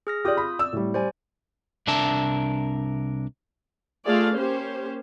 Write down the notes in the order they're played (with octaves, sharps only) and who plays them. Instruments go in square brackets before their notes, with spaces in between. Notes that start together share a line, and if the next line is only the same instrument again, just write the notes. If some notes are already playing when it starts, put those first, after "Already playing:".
[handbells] G#4 F6 A#6
[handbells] F4 D#6 G6 [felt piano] G4 D5
[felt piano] B5
[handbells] D5 [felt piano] E6
[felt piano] A2 G3
[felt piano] G3 [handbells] C5 D5 G#5
[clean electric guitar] C2 C3 D4 A#4 E5 A5
[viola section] A3 F4 G#4 D5 F5
A#3 C#4 G4 C5